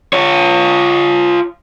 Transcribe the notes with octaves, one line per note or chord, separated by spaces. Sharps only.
F4 C#5